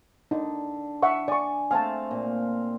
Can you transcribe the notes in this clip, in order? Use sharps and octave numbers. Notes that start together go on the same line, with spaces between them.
D3 D#4
E5 F#5 C#6
D5 G#5 C#6
A3 C4 F5 G#5 A5
A#2